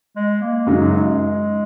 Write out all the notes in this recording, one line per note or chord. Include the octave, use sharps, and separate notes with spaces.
G#3
A#3
F#2 C#3 F#3 G#3 D#4